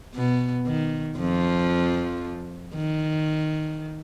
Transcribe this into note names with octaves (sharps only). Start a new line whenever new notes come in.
B2 B3
D#3
F2 F3
D#3